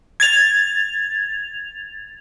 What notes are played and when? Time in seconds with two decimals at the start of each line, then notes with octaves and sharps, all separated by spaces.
0.20 G#6 A6 F7